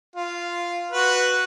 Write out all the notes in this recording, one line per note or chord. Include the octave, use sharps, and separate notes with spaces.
F4
F#4 B4